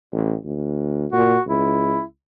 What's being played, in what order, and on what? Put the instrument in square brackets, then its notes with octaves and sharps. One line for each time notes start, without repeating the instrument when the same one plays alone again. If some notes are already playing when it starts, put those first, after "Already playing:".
[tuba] A1
D2
[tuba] A#2 [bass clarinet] F#4
[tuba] C#2 [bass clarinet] E4